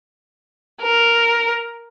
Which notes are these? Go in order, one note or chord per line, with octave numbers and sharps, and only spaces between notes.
A#4